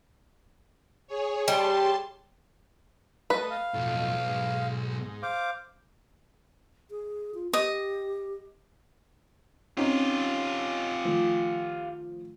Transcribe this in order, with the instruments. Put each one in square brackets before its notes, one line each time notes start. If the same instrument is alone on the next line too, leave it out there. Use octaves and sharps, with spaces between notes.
[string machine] G#4 C#5
[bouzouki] G3 [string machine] A5 C6
[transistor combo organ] A3 D#5 [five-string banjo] B4
[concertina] F5
[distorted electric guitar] B1 [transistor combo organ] F2 A2
[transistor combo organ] G#2
[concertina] C5 F5 D6
[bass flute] G#4
F4
[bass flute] G4 [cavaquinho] D#5
[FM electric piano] C4 [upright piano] C#4 D#4 [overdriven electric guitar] F4 G4
[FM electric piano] D#3 A3 [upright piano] F3